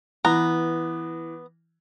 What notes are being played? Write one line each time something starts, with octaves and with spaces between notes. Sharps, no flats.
E3 B3 A#5